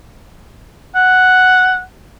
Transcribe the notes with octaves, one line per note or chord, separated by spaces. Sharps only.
F#5